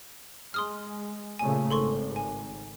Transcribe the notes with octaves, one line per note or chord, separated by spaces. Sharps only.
G#3 C6 D#6 F6
A#2 C#3 A3 G#5
G#1 A4 C6 C#6
G#5